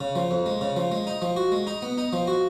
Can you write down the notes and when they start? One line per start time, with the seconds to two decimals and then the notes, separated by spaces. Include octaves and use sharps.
0.01 C#3
0.16 F3
0.31 F2
0.46 G#3
0.61 C#3
0.76 F3
0.92 G#3
1.07 D#4
1.22 F3
1.36 F#4
1.52 G#3
1.67 D#4
1.82 B3
1.98 D#4
2.13 F3
2.27 F#4